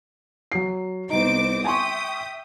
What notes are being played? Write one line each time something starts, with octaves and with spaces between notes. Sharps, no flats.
F#3 C7
C2 B3 D#4 C5 D6
E5 G5 G#5 C6 C#6 D#6